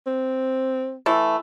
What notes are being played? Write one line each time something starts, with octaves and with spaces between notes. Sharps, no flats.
C4
E3 A3